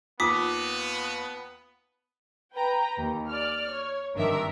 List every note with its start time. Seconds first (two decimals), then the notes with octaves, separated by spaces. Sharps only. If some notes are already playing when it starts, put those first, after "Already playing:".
0.20 D#2 B3 F4 A4 B4 D6 D#6 B6
2.55 B4 G5 A#5
2.99 D#2
3.29 D5 F6
3.72 C#5
4.15 G#1 G2 D#3 D4 A#4 E5